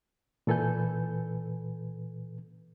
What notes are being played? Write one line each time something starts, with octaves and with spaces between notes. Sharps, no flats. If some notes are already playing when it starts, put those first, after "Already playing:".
A#2 E3 A4 B4 G#5 G6